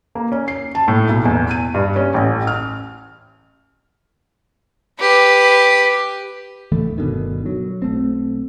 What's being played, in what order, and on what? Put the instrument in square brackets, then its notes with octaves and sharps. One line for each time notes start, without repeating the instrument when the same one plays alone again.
[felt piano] A#3
C#4
C7
A5
A2
B1
E2
D#7
G2
C#4
A1
F6
[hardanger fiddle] G4 B4
[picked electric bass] D1 D2 E3 A3
G1 B2 D3 D#3
F#3
B1 A3 C4